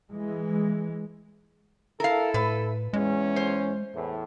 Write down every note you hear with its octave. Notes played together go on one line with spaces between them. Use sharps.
E3 G#3
E4 A4 A#4 F5
A2 B4
E2 G#3 C#4
C5
E2 A2